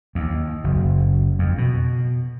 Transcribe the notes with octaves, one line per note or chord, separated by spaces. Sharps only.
D#2
F#1
F2
B2